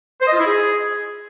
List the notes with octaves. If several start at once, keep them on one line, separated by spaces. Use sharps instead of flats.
C5
D#5
F4
E4
G#4